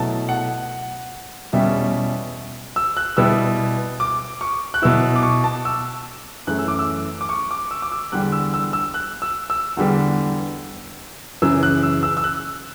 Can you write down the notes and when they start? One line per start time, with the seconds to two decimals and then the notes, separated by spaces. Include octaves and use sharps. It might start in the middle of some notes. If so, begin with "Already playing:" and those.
Already playing: B2 F#3 A3 E4 A5
0.29 F#5
1.53 E2 B2 G3 C#4 E5
2.76 E6
2.97 F#6
3.17 B2 G3 B3 E4 E6
4.00 D6
4.41 C#6
4.74 F#6
4.82 B2 F#3 B3 E4 E6
5.16 D6
5.23 C#6
5.44 A5
5.65 E6
6.47 F#2 E3 A3 F#6
6.58 E6
6.68 D6
6.79 E6
7.21 D6
7.29 C#6
7.51 D6
7.71 E6
7.82 D6
7.92 E6
8.12 E2 D3 G3 F#6
8.32 E6
8.54 E6
8.73 E6
8.94 F#6
9.22 E6
9.50 E6
9.77 E2 D3 G3 B3
11.42 F#2 C#3 E3 E6
11.63 F#6
11.83 E6
12.03 E6
12.17 E6
12.24 F#6